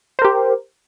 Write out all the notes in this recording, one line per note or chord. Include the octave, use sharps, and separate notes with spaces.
G4 A#4 C5